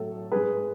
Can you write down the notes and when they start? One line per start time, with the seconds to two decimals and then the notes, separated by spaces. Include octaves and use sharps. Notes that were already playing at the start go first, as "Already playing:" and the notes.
Already playing: A2 F#3 A4
0.32 G#2 G#3 G#4 B4